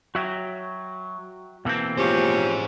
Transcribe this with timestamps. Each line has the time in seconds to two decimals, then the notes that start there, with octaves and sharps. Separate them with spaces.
0.15 F#3 F#4 E5 G5
1.65 B2 E3 A#3 C4 A4
1.98 F3 C#4 G4 G#4 C5